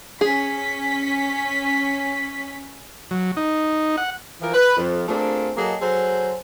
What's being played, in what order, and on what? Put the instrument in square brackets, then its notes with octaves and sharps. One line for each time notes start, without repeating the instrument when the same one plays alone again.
[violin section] C#4 B6 [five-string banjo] G#4
[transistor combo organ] F#3
D#4
F#5
[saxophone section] E3 F3 A#4
B4
F2
A3 A#3 C4 D4 F4 G#4
F#3 A#3 G#4 A4 D#5
F#3 G#4 A4 C5